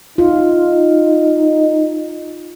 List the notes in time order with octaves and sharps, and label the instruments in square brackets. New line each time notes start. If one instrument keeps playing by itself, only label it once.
[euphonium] D#4 [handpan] F4